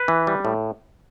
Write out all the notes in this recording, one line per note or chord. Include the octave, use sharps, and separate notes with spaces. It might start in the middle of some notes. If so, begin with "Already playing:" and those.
Already playing: B4
E3
G3
A2